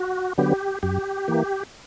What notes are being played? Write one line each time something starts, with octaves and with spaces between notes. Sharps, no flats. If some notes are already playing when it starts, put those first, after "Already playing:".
Already playing: F#4
D3 F#3 B3 G4
F#2 G4
E3 A#3